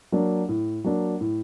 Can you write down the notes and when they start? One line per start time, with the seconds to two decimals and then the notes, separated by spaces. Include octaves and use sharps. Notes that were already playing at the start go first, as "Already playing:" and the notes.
0.12 F#3 A#3 D4
0.49 A2
0.84 F#3 A#3 D4
1.21 A2